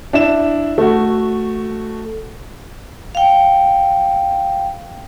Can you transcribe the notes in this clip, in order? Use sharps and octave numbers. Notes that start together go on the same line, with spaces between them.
D4 E4 E7
A3 F#4
F5 G5